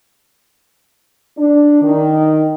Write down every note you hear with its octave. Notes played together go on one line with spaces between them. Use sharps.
D4
D#3